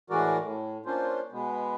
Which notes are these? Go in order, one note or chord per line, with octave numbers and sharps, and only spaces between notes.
A2 E3 G#3 F#4 A#4 D5
A2
A#3 C#4 D4 F4 C5
B2 G#3 B3